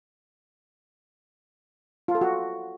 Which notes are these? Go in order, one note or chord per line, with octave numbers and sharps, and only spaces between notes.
F4
A4
F#4